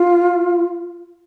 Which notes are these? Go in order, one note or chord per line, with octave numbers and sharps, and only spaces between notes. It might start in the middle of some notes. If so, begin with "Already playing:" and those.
Already playing: F4